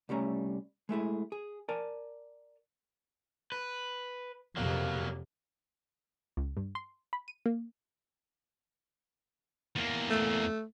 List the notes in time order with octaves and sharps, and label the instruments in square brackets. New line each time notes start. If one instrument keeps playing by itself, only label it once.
[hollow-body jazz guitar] C2 G3 A3 C#4 A#5
G#3 A3 E4 G#4
G#4
A#4 D5 G#5 A5
[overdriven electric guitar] B4
[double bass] F2 C3 [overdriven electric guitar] F#3 A#3
[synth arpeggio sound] C#2
G2
C6
B5
D#7
A#3
[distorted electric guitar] E2 A#3
[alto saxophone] A3